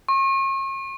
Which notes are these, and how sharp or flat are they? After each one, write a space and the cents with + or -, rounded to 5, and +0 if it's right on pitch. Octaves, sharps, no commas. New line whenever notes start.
C#6 -40